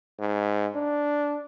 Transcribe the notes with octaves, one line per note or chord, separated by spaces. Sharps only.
G#2
D4